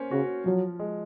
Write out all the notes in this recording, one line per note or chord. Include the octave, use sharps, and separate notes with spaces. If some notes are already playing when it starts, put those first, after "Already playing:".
Already playing: A#3 C#4 C5
C#3 F#4
F3 F#3
G#3